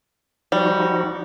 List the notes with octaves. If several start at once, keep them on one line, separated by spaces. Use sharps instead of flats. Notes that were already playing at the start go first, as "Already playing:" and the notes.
F3 G3 D#4 F#4